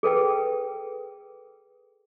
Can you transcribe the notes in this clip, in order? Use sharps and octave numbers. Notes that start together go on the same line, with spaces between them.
G#4 A4 B4 G5